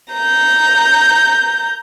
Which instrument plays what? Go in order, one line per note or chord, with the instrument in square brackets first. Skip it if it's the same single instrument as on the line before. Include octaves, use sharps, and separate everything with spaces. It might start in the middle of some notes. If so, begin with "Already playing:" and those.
[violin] A#5 G6